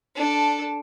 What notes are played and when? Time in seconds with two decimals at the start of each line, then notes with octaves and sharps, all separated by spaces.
0.16 D4 A4